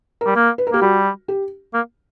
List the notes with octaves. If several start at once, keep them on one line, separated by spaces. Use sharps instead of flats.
A#4
G3
A#3
B4
A#4
A#3 G4
G3 F#4
G4
A#3